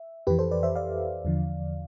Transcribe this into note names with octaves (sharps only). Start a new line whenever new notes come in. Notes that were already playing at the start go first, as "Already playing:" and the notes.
Already playing: E5
F2 E3 G4 B4
A4 C5
B4 D5
C5 E5
D5 F5
E2 D3 F3